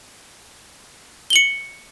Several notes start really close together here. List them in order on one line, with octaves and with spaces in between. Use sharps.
G7 F#7 C#7